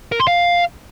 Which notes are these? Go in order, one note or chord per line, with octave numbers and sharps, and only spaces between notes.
A#4
C6
F5